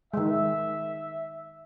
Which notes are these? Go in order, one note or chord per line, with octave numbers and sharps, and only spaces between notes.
D#3 G#3 E5